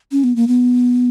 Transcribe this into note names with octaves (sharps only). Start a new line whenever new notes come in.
C#4
B3
A#3
B3